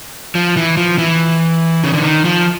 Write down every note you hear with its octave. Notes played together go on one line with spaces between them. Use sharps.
F3
E3
F3
E3
C#3
D3
D#3
F3